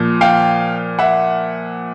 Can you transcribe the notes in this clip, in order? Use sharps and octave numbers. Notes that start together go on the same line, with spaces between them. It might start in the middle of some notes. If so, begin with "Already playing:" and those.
Already playing: A#2 F3
F5 G5
E5 F#5